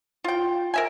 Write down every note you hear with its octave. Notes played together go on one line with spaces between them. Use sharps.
F4 G5
A#4 E5 G#5